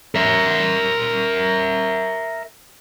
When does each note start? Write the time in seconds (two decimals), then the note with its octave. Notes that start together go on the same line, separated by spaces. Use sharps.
0.15 A#4 E5